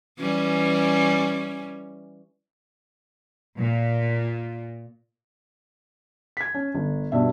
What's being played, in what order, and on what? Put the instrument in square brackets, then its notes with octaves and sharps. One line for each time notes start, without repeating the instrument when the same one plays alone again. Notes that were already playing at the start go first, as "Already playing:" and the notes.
[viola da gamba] E3 G3 C#4
[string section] A#2
[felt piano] G#6 B6
C#4
G1
G2 B2 E5